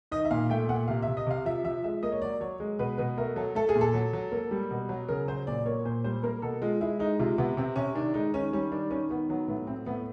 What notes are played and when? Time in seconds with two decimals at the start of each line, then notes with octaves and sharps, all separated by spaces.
0.12 D#3 D#5
0.25 E5
0.31 A#2 F5
0.50 A3 G5
0.69 A#2 F#5
0.88 C3 F5
1.02 C3 E5
1.17 D#5
1.27 C3 F5
1.45 F3 E5
1.64 F3 E5
1.84 G#3 E5
2.03 A#3 D#5
2.12 C#5
2.22 F#3 D5
2.41 F#3 C#5
2.60 G#3
2.79 B2 B4
2.98 B2 B4
3.17 A3 A#4
3.36 F#3 A4
3.55 A3 A4
3.69 G#4
3.76 A#2
3.81 A4
3.94 F#3
4.13 F#3
4.32 A#3
4.51 G3
4.71 B2
4.89 F#3
5.08 C#3 A#4
5.28 F#3 C5
5.47 A#2 D5
5.65 A#3 C#5
5.85 A#2 C5
6.04 G3 C5
6.23 A#3 A#4
6.42 B2 A4
6.62 G#3 F4
6.81 G#3 E4
6.99 G#3 D#4
7.19 C3 F4
7.38 C3 B3
7.57 C3 C4
7.76 C3 C#4
7.95 D#3 D4
8.14 G#3 D#4
8.34 D#3 C#4
8.53 G3 C#4
8.72 D#3 D4
8.90 D#3 C#4
9.10 D#3 B3
9.29 F#3 B3
9.48 A2 B3
9.67 A2 C4
9.86 A2 B3